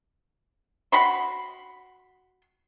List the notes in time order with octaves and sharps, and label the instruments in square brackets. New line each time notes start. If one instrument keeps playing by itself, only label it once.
[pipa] F#4 B5 C6